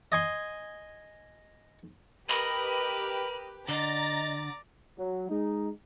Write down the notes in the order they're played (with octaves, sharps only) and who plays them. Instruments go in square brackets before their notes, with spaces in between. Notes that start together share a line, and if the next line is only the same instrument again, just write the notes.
[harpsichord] D#5 G#5 C6
[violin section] G4 B4 [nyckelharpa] A#4 [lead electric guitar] D#5 [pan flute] B5
[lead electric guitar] D3 [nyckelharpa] D5 [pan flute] D#5 [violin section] A#5 A6
[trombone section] F#3
G#3 D#4